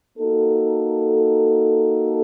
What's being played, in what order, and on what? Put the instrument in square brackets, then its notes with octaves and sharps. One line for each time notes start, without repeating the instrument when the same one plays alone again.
[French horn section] A#3 D#4 F#4 A4